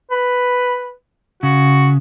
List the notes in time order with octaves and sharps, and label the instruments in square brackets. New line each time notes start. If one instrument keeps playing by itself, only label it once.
[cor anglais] B4
[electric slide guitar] C#3 [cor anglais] F#4